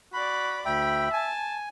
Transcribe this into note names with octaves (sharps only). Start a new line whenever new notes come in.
F#4 D5 B5
D2 E5 G5 B5
G#5 A5